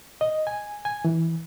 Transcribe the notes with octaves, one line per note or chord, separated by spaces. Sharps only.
D#5
G#5
G#5
E3